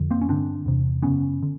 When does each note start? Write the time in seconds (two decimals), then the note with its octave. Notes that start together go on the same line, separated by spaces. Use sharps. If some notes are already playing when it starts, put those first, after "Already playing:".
Already playing: F2 D3
0.11 A#3 C4
0.22 C#4
0.29 G2 D3 C4 D4
0.66 E2 C3
1.02 F#2 C#3 B3 C#4
1.43 D3